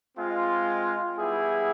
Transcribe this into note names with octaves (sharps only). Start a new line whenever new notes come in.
G#3 C4 F4
G3 B3 E4 G#4